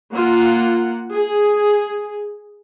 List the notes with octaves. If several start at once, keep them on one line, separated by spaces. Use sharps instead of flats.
A#3 F4 F#5
G#4